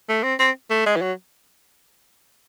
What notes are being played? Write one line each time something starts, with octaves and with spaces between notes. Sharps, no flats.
A3
C4
C4
A3
G#3
E3
F#3